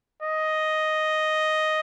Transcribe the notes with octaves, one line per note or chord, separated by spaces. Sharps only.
D#5